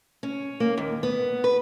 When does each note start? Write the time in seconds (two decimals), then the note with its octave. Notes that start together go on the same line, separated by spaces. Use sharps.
0.23 C#4
0.60 A#3
0.77 D#2
1.03 B3
1.44 B4